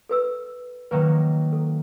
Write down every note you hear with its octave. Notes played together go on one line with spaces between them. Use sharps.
A4 B4 E6
D#3 F#3 A#3 B4
A4